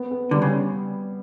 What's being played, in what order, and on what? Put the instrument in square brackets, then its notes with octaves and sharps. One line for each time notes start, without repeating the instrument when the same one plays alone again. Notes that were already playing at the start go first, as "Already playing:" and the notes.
Already playing: [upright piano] B3
B3
[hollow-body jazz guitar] D3 [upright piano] G3
[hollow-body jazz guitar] C#3